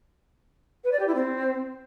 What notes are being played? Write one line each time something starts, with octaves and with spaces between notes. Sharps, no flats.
B4
D5
G4
E4
C4